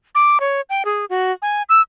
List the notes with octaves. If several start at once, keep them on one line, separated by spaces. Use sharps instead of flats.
D6
C#5
G5
G#4
F#4
G#5
E6